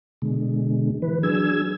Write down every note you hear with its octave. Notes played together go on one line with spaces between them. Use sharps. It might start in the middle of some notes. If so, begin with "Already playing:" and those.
B2 D3 G#3
E3 B4
F#3 D4 G#4 E6 G#6